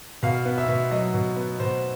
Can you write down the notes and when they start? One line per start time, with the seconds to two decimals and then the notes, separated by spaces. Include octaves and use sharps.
0.23 B2 F5
0.45 B3
0.58 E5
0.68 B2
0.91 F#3 D#5
1.14 B2
1.36 B3
1.59 B2 C5